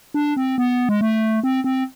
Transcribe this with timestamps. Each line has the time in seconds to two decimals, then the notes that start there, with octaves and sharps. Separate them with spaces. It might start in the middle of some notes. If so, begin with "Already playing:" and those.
0.14 D4
0.37 C4
0.58 B3
0.89 G#3
1.01 A3
1.44 C4
1.64 C4